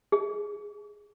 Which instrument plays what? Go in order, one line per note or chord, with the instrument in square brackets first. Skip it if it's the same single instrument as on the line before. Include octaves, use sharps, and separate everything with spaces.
[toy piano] G#4